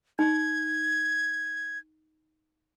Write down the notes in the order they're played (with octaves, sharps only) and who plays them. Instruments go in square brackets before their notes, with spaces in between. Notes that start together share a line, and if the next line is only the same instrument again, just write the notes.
[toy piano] D#4 [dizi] G#6